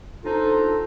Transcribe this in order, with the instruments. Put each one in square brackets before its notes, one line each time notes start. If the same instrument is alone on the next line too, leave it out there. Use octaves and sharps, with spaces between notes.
[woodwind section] C4 D4 D#4 F4 A4